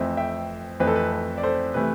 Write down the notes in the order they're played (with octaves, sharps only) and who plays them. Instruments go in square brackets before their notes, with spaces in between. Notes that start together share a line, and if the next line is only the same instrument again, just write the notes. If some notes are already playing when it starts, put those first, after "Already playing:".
Already playing: [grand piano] F2 E3 A3 C4 C5 E5
E5 G5
F2 E3 A3 C4 B4
A4
B4
B4
D5
A4 C5
C3 E3 A3 B4